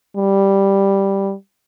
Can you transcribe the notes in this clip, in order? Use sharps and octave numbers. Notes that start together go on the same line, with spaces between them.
G3